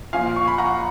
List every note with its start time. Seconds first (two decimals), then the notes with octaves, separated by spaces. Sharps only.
0.13 A#2 F3 F5 G#5
0.36 C#6
0.48 B5
0.58 F#5 A#5